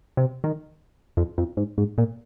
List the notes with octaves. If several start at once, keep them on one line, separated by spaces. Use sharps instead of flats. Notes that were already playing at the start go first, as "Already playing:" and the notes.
C3
D#3
F2
F2
G#2
G#2
A#2